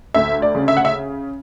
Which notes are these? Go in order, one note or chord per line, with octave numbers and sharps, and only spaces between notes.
D2 E5
D5
C#3
E5
F#5
E5